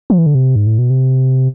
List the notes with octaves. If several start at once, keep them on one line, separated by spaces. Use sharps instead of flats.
F3
E3
D3
C3
G#2
A2
B2
C3